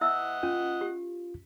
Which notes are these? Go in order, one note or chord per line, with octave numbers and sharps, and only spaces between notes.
E4 D#5 E5 F#5 E6
C#4 F4
G4